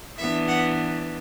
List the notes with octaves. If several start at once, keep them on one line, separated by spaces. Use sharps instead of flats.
E3 B3 D4 E5
F#5